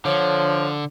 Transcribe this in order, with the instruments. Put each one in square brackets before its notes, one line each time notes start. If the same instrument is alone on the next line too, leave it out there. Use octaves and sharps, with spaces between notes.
[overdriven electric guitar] D3 [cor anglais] F3 [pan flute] C#5